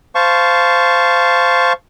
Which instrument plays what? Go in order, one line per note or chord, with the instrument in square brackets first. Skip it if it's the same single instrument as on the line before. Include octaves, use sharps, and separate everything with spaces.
[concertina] C5 F5 A5 C#6